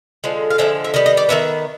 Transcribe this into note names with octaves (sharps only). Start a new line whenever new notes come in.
D3 F3 G#3
F5
D3 F3 G#3 E5
E5
D#3 G3 B3 D#5
D#5
D5
D#3 G3 B3 E5